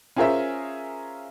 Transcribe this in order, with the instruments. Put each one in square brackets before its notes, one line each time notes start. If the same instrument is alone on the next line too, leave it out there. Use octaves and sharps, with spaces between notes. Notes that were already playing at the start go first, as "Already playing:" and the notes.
[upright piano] C#4 F4 G#4 A#4 C5 E5